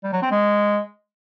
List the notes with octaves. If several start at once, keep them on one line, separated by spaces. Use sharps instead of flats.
G3
F#3
C4
G#3